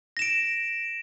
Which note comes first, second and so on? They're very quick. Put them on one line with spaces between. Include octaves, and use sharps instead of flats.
A#6 E7 D7